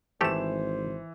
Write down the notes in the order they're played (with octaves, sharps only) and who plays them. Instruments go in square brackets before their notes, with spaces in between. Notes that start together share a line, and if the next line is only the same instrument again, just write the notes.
[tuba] G#1 [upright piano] E3 E7 [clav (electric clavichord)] A3 G4 A4 [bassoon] C5